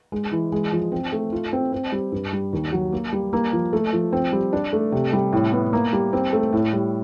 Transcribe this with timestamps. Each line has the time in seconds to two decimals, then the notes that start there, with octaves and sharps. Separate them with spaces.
0.12 G#3
0.31 E3
0.52 G#3
0.72 F3
0.92 C4
1.12 A3
1.32 F4
1.53 C4
1.73 C4
1.92 G3
2.12 G2
2.33 G3
2.53 D#2
2.72 F#3
2.92 A#3
3.13 G3
3.33 A#3
3.53 F3
3.73 A3
3.93 F3
4.13 C4
4.32 G3
4.53 D4
4.73 A3
4.92 C3
5.13 G3
5.33 A2
5.53 B3
5.73 A#3
5.93 G3
6.13 C4
6.33 A3
6.53 A2
6.73 G3